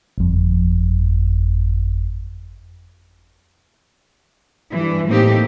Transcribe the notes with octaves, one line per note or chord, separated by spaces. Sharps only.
G1 F2
G2 E3
A2 A#3 C4 D#4 G4